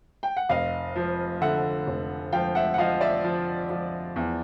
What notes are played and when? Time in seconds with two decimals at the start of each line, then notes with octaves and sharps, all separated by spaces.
0.23 G5
0.37 F#5
0.49 F1 D#5 F5
0.96 F3
1.41 D3 E5 F#5
1.87 F1
2.32 F3 F5 G5
2.55 E5 F#5
2.74 F#5
2.78 F3 D#5 F5
3.01 D5 E5
3.24 F3
3.69 F3
4.16 E2